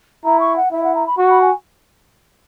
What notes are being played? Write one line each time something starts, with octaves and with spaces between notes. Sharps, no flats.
E4 A#5
C#6
F#5
E4 E5
F#5
A#5
B5
F#4 C#6
B5
G#5